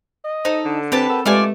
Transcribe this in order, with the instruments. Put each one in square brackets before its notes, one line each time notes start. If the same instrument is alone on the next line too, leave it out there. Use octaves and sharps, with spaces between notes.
[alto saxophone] D#5
[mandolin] D#4 A4 [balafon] C5
[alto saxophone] D3
[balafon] C4 C5 [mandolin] G4 B4 A5
[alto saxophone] A4 [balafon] A#4 F#5
[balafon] G#3 G4 B4 [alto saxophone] A3 [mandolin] F4 D5 G#5